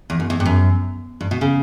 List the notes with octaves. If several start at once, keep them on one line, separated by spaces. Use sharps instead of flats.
E2
F#2
E2
G2
F#2
G2
B2
C#3